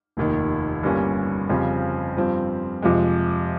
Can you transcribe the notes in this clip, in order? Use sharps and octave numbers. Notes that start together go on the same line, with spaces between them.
F1 D#2 D#3
G1 G2 G3 A#3 C#4
F2 C#3 G3 C4 F4
G2 F3 C4
F2 C3 F3 G#3